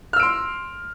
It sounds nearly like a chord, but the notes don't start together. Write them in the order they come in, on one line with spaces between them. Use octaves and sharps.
F6 E6 D7 C6